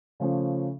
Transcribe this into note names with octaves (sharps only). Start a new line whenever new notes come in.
C#3 F3 A3 C#4